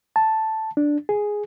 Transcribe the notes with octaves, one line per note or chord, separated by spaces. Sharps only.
A5
D4
G#4